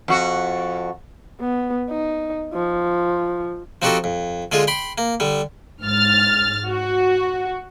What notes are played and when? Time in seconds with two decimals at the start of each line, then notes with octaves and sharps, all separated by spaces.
0.08 F2 F#4
1.41 B3
1.90 D#4
2.54 F3
3.82 F3 C4 D#4 F#4 G4 A4
4.04 F2
4.52 D3 G#3 F4 G#4
4.67 G5 B5 C6
4.98 A#3
5.20 D3 G3
5.82 G#2 F6 A6
6.67 F#4